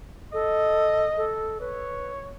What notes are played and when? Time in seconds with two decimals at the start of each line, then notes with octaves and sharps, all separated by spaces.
0.33 A4 D#5
1.17 A4
1.60 B4 C#5